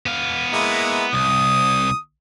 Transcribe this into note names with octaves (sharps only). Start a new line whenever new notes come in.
B3 F5
G#3 A#3 E4
C2 D#6